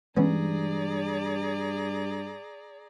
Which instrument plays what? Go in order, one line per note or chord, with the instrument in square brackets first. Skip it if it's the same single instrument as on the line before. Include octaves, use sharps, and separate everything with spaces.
[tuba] G2 [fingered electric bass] E3 G#3 [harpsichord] B3 C#4 [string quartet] G#4 D5 A#5